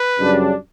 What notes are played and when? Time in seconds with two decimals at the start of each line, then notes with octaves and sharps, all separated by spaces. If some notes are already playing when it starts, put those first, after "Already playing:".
Already playing: B4
0.18 F#2 C#3 G3 D4